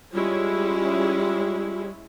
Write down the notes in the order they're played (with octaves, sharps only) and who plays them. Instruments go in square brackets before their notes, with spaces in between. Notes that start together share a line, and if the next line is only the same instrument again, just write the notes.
[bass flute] G3 [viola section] G#3 C#4 E4 [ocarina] F4